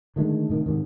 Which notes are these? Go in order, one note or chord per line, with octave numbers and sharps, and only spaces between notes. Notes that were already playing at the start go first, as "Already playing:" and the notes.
D3 D#3 G#3 A3
A2 C3 D#3
G#2 C3 D#3